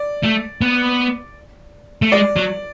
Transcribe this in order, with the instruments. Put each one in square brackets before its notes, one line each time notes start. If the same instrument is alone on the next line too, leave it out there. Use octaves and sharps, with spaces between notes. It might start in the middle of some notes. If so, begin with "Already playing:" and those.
Already playing: [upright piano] D5
[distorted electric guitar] A3
B3
A3
[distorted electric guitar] G#3 [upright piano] D5
[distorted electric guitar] F#3